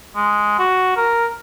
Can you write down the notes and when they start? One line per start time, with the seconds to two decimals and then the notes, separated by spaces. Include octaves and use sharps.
0.16 G#3
0.59 F#4
0.97 A#4